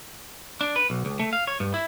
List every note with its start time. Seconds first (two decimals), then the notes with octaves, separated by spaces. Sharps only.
0.61 D4
0.76 B4
0.90 B1
1.05 C#2
1.19 A3
1.33 F5
1.47 C#5
1.60 G2
1.74 E4